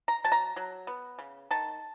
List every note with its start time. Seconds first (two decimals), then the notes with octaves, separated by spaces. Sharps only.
0.08 A#5
0.24 F#3 A5
0.32 A#5
0.56 F#3
0.87 B3
1.19 C#3
1.51 D#3 A5